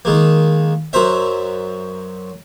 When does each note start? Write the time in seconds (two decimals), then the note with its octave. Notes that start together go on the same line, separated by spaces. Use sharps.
0.05 D#3 G#3 A#3
0.93 F#2 F#3 A#4 C5 E5